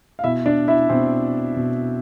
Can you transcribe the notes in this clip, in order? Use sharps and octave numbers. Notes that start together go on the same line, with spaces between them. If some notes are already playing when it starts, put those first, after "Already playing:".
F5
B2 E4 E5
D4 D5
E4 E5
B2 C4 C5
B2